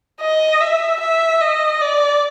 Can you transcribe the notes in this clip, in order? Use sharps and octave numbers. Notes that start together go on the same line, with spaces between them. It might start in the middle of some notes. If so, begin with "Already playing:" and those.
D#5
E5
E5
D#5
D5